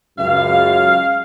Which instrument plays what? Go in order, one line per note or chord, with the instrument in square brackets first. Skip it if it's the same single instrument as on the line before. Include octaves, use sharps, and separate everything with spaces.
[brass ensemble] C#2 F#2 [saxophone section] F5